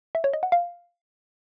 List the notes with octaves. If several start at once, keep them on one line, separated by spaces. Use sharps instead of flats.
E5
C#5
D#5
F#5
F5